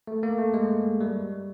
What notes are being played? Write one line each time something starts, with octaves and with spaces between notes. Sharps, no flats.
A3
A#3
A3
G#3
G3